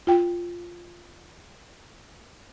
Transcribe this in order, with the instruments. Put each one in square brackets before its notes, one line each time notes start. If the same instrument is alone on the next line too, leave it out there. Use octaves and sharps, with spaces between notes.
[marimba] F4 G5